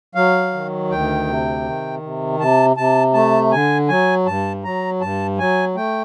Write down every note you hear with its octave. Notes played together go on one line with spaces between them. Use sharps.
F#3 F5
D#3
D2 G5
C3
D#3
C3
C3 A5
C3 A5
A3 A5
D3 G#5
F#3 G#5
G2 A5
F#3 A#5
G2 A5
F#3 G#5
A3 G5